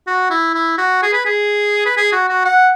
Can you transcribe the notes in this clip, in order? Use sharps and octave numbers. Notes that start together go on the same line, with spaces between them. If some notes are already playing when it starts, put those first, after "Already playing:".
F#4
E4
E4
F#4
G#4
B4
G#4
B4
G#4
F#4
F#4
F#5